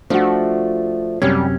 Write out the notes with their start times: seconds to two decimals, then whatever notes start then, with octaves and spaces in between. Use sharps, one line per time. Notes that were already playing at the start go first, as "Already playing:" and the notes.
0.10 F3 A3 D4 F#4
1.22 F#2 C3 G3 C#4